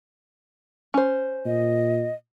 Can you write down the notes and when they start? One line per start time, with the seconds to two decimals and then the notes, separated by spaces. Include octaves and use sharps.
0.94 C#4 C5
1.46 A#2 D#5